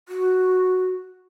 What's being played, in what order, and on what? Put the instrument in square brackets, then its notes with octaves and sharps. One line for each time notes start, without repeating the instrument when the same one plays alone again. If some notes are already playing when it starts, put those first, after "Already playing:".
[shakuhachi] F#4